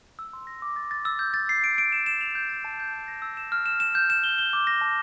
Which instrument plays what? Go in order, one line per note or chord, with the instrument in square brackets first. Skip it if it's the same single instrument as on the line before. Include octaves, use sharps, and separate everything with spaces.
[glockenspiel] E6
C6
A#6
D6
A6
A6
E6
G6
A6
C7
D7
D7
E7
E7
F7
G6
A6
A5
G6
G6
A#6
E6
E7
F6
E7
E7
G6
E7
G7
G7
D6
A#6
A5